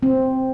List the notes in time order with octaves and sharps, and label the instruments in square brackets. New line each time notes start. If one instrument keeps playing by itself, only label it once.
[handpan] C4